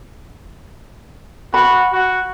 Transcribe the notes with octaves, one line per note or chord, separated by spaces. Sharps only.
F#4 B5
F#4